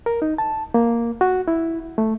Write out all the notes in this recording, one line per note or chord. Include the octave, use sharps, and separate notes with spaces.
A#4
D#4
A5
A#3
F#4
E4
A3